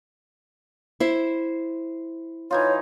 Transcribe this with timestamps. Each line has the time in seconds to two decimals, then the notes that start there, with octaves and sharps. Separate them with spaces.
1.00 E4 C5
2.51 E3 D#4 F4 C#5